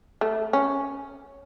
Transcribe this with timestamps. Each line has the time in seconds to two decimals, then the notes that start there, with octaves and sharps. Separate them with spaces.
0.21 A3
0.53 C#4